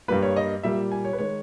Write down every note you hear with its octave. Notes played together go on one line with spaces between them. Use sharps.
G2 G3 A#3 B4
C#5
D#5
A#2 G3 A#3 E5
G#5
C#5
B4
D#3 G#3 C#5